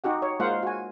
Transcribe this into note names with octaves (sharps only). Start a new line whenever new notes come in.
D#4 F#4 G4 F#5
C#5
G#3 A#3 F4 C5 F5 F#5
F#4 G#5